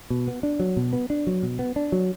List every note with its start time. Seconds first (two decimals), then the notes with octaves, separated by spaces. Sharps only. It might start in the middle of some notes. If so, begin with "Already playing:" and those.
0.10 B2
0.28 B3
0.43 D4
0.60 F#3
0.77 B2
0.93 B3
1.10 D4
1.27 F#3
1.43 B2
1.59 B3
1.76 D4
1.92 F#3